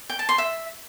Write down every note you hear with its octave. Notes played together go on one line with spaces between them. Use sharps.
G5
A5
C6
E5